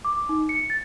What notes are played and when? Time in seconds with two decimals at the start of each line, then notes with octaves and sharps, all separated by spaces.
0.05 D6
0.29 D#4
0.49 C#7
0.70 A6